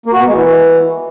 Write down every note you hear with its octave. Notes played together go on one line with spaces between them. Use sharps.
A#3
F#4
B3
G#3
E3